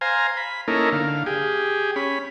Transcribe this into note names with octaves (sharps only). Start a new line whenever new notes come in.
C5 F5 G#5 A#5
B5
A#3 C#4 D#4 E4 A4 A#4
D3 F5
G4 G#4
C#4 B5